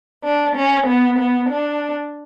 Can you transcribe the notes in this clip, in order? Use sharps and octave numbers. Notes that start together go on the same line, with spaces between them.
D4
C#4
B3
B3
D4